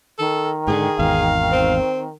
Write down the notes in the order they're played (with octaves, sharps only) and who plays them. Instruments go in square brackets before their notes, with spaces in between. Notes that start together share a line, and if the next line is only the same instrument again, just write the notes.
[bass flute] D#3 [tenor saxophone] A4
[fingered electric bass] G#2 B2 D3 [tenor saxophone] G#4
[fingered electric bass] G#1 E2 [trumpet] F5
[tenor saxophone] C4